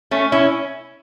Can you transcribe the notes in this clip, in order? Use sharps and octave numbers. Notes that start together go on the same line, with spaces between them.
A3 C#4
C#4 E4